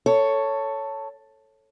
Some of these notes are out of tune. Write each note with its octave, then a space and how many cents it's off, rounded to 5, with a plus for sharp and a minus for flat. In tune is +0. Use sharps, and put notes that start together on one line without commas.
A4 +10 C#5 +5